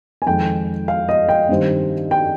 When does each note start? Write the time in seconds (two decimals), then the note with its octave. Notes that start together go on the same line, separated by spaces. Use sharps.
0.22 G#5
0.27 F2 D#3 G#3 G5
0.88 F5
1.09 D#5
1.29 G5
1.49 G2 D#3 G3 C4
2.11 G5